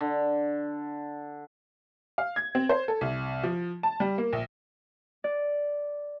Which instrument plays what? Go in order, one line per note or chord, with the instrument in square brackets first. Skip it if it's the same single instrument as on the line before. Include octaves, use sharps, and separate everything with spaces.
[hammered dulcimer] D3
[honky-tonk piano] F5
G#6
C4
C5
A4
C2
F3
A5
G3
A#3
A#1
[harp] D5